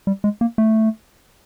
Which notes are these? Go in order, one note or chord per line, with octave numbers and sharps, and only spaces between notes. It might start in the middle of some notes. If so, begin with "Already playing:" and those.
G3
G#3
A#3
A3